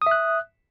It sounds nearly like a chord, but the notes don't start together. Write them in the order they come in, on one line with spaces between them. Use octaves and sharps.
D#6 E5 F#6